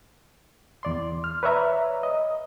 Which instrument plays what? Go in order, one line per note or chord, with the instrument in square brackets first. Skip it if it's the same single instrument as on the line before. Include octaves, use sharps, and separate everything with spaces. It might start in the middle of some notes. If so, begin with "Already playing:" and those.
[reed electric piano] E2 D5 C6
F6
B4 C#5 D5 E5 A#5
D#5